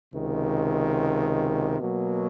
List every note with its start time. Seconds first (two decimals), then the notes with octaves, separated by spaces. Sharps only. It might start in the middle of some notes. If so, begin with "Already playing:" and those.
0.13 C#2 C3 D#3
1.78 B2 F#3 A#3